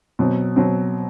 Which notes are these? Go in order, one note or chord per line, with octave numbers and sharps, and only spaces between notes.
B2 F#3 C4
B2 F#3 C4